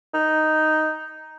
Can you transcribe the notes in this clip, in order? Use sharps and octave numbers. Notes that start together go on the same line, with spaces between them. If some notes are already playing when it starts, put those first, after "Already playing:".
D#4